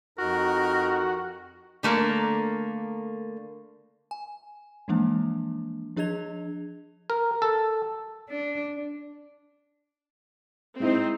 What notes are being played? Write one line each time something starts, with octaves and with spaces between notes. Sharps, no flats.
F2 D#4 F#4 A#4
D3 A3 A#3 A#4
G#5
E3 F3 G#3 A#3 D4
F3 D4 G#4 D#5 G#6 F7
A#4
A4
D4
G#3 C4 D#4 E4 C5